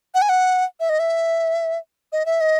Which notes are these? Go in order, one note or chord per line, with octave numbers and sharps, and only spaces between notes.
F#5
G#5
F#5
E5
D#5
E5
D#5
E5
D#5